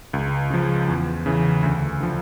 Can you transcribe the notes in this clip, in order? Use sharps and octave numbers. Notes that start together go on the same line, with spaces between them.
C#2
C#3 F3
E2
C#3 E3
D2
D3 F3